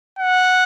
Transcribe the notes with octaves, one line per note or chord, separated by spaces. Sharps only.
F#5